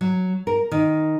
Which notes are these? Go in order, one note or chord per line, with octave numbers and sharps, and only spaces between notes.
F#3
A#4
D#3